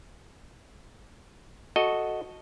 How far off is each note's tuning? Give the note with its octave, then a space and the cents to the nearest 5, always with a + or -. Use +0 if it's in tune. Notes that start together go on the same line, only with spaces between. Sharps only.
F#4 +0 A4 +0 D#5 +0